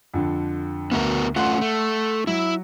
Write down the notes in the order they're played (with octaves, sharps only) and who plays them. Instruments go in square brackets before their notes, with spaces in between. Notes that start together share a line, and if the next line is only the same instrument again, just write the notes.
[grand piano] F2 D3
[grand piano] D2 [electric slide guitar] B3 F#4 A#4
[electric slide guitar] A3 C#4 F4 [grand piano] F#5 C6
[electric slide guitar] A3
[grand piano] F#3 [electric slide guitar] E4